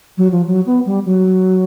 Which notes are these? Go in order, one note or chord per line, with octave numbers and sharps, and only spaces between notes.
F#3
F3
F#3
B3
G3
F#3